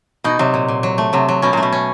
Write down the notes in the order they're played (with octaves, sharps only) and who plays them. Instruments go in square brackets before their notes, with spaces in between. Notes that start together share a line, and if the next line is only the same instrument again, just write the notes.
[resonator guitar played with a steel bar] B2 [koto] D#4
[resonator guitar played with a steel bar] C3 [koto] F#3
[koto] A#2
A#2
F#3
A3
[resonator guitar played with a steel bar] C3 [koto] F#3
[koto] F#3
[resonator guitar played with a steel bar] B2 [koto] C#4
[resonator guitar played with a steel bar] A#2
[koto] A3
[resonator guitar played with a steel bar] B2
[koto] C#4